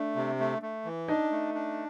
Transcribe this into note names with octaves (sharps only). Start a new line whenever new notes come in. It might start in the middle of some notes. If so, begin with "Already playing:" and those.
Already playing: A3 D4
C3
A3
A3
E3
D4 D#4
A3
D4